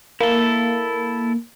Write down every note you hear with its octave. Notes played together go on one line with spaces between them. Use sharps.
A#3 E4 A4